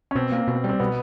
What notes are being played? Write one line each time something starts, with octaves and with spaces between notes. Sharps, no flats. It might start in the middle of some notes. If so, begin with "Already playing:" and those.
C#4
B2 C4
A#3
B2
G3
C4
B2 B3